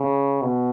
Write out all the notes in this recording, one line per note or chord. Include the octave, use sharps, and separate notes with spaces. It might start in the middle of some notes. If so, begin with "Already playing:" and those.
Already playing: C#3
B2